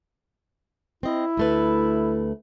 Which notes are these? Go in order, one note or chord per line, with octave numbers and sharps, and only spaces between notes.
C4 E4 D#5
D2 A3 B4